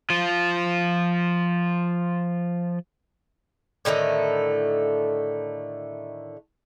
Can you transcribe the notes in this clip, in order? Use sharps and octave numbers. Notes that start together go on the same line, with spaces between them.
F3 F4
A2 D3 D#3 A3